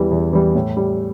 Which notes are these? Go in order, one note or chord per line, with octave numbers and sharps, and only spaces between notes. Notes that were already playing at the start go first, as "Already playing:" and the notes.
Already playing: E2 E3 G3
E2
E3 G3
A2
G3